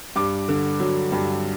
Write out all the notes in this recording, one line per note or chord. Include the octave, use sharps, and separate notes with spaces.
G2 D6
D3
F#3
G2